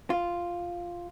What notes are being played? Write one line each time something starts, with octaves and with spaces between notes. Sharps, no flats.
F4